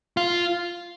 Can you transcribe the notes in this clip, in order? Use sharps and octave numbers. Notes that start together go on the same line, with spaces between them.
F4